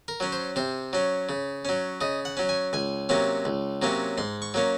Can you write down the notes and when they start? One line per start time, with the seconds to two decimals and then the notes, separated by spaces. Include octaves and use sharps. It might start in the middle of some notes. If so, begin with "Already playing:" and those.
0.08 A#4
0.20 F#3 C#4
0.32 C5
0.56 C3 C5
0.93 F#3 C#4
1.29 C#3
1.65 F#3 C#4
2.01 C#3 D#5
2.25 F#5
2.37 F#3 C#4
2.49 G#5
2.73 C#2 G#5
3.09 C3 F#3 A#3 C#4
3.45 C#2
3.82 C3 F#3 A#3 C#4
4.18 G#2 C6
4.42 C#6
4.54 F#3 A#3 C#4